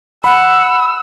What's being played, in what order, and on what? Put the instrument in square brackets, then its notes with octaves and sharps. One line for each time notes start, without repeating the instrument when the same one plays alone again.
[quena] F#5 [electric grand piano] B5 [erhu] E6